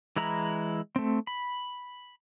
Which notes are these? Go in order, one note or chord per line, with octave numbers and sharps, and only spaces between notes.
E3 G#3 E4 A#5 B5
A3 C4
B5